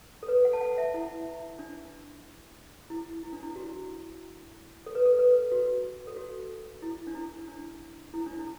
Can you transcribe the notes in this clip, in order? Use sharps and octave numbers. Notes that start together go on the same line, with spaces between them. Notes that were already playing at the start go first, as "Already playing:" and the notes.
A4
B4
F#5
A5
F#5
E5
E4
D4
E4
E4
D4
E4
F#4
A4
B4
A4
B4
F#4
A4
F#4
E4
D4
E4
D4
E4
D4
E4